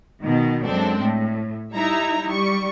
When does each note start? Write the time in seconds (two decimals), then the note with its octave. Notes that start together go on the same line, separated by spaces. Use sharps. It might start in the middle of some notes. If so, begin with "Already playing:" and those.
0.21 B2 D#3
0.64 F#2 G#3 C4 D4 A4
1.02 A2
1.74 G3 D#4 E4 E5 A#5
2.28 G3 C#6